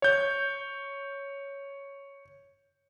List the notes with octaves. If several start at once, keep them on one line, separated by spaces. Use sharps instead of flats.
C#5 G6